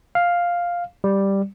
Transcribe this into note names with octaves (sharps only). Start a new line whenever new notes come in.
F5
G3